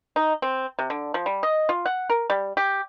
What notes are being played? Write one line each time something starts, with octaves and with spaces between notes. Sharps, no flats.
D#4
C4
C3
D3
F3
G3
D#5
F4
F#5
A#4
G3
G4